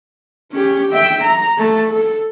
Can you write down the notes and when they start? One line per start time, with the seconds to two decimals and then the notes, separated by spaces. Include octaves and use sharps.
0.52 C#4 G4
0.92 E5 G5
1.24 A#5
1.58 A3 A5
1.91 A4